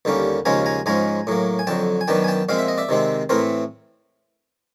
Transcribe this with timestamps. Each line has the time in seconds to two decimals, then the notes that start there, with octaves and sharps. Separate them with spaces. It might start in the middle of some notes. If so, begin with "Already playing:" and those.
0.05 D#2 D3 G3 A#3 C#4
0.45 D#2 C#3 F3 G#3 C#4 G#5 A#5
0.66 G#5 A#5
0.86 G#2 F3 G#3 C#4 G#5 A#5
1.27 A2 F#3 A#3
1.59 G#5
1.67 F2 D3 F#3 G5 A5
2.01 G#5
2.08 F#2 D#3 F#3 B3 D4 G5 A5
2.24 G#5
2.28 G5 A5
2.49 A#2 F3 G#3 C4 F5
2.59 E5
2.68 D#5
2.78 D5 E5
2.89 C3 D#3 G#3 C4
3.29 A2 E3 A3 C4 A#4 C5